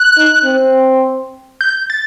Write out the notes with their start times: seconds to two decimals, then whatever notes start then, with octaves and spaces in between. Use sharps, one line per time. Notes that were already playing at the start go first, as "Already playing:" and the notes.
Already playing: F#6
0.16 D#4
0.44 C4
1.61 G6
1.90 A6